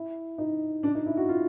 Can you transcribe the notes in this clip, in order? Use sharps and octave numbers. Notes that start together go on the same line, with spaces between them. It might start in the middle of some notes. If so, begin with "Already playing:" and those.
Already playing: E4
D#4
D4
D#4
E4
F#4
F4